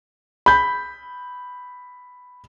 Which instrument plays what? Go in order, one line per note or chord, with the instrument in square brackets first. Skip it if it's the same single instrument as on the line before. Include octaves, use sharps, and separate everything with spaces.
[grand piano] B5 G6